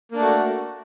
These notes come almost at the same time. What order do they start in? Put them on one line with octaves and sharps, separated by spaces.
A#3 D4 A3 F#4